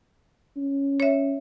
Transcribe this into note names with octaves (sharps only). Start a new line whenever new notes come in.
C#4
C#5 E5